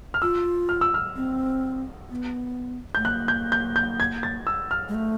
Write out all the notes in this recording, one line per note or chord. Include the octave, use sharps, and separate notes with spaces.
F6
F4 E6
F6
E6
F6
C4
B3
A3 G6
A#3 F#6
G6
G6
G6
G#6
A6
E6
F6
G#3
A3